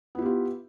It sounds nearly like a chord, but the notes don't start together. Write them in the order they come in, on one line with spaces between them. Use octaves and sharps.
B3 E4 G4 F4